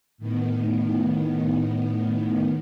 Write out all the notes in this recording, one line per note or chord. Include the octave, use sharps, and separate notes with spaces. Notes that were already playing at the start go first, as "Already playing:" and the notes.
A2 D#3 B3